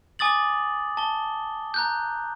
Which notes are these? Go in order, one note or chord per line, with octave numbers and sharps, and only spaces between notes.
G#5 D6 D#6 A6 F#7
A5 G7
A#5 F#6 G6